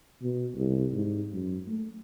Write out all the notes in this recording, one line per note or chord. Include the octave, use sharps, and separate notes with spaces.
B2
C2
G#2
F#2
A3